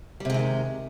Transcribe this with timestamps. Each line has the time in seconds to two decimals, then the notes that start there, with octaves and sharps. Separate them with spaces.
0.20 G3
0.25 C3
0.30 G#3
0.34 E3
0.39 D#3